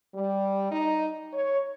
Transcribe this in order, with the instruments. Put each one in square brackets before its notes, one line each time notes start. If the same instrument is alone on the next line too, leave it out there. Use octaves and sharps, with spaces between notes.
[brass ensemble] G3
D#4
C#5